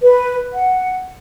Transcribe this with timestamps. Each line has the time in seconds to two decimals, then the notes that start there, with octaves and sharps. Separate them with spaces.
0.02 B4
0.53 F#5